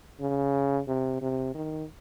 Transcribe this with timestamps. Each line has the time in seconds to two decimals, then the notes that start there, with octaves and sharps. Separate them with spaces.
0.21 C#3
0.88 C3
1.21 C3
1.55 D#3